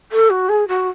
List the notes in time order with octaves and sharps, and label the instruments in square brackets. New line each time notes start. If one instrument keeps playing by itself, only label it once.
[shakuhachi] A4
F#4
G#4
F#4